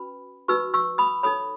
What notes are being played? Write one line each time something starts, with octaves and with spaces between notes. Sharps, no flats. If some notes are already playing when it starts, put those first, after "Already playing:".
Already playing: C#4 F#4 B4 B5
D#4 F#4 B4 C#6 E6
C#6 E6
B5 D#6
D#4 A4 C#5 B5 D#6